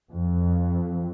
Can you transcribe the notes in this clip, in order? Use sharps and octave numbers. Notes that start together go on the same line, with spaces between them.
F2